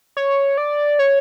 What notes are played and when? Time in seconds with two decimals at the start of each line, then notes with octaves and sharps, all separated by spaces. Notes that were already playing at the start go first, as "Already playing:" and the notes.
0.17 C#5
0.58 D5
0.99 C#5